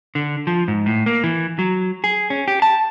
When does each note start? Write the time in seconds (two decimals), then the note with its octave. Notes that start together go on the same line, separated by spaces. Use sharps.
0.15 D3
0.47 F3
0.68 G#2
0.86 A2
1.06 A#3
1.24 E3
1.59 F#3
2.04 G#4
2.30 C#4
2.48 G4
2.62 A5